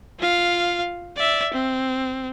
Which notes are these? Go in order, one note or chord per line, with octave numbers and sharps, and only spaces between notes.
F4 F5
D5 E5
C4